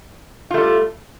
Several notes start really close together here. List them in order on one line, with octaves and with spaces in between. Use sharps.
F4 A3 G3